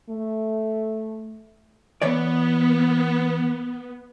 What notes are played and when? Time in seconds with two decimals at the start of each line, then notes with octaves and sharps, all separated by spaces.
0.10 A3
2.02 E3 B3 C#5 D5